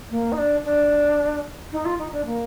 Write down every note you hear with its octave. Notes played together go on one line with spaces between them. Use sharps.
A#3
D#4
D4
D4
D#4
F4
D#4
D4
A#3